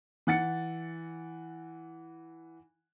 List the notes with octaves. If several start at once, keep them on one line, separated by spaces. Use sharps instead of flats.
E3 F#5 A6 C#7